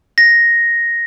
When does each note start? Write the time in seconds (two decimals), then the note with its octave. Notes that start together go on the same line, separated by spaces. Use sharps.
0.18 A#6